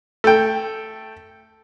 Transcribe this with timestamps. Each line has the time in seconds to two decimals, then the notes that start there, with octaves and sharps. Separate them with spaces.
0.24 A3 G5